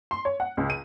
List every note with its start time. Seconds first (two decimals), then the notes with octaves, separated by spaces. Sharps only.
0.11 C6
0.25 C#5
0.40 F#5
0.57 C#2
0.70 D#7